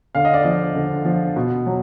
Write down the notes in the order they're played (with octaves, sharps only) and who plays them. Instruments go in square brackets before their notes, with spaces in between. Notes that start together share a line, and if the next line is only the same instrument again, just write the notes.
[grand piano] D3 F5
D#5
D5
F3 D#5
D3
F3
B2
F#3